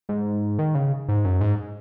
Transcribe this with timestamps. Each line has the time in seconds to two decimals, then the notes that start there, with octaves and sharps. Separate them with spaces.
0.09 G#2
0.59 D#3
0.75 C#3
1.09 G#2
1.25 F#2
1.41 G#2